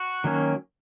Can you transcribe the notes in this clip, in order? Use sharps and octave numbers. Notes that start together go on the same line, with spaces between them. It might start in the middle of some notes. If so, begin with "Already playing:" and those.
Already playing: F#4
D#3 F#3 A#3 C#4